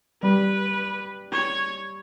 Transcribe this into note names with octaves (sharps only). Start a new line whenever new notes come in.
G3 B4
C#5